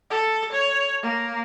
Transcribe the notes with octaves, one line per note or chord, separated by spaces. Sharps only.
A4
C#5
A#3